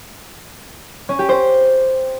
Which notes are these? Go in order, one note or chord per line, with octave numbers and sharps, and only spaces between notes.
C#4
G4
C5